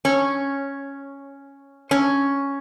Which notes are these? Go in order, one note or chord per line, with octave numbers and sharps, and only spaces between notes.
C#4
C#4